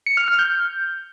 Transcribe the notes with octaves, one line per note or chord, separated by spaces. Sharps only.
C#7
F6
F6
G6